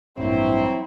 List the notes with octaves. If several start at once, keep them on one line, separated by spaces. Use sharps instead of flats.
A1 G2 A#2 F#3 C4 E4